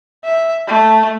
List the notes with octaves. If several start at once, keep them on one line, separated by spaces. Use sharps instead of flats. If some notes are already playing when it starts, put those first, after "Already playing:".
E5
A3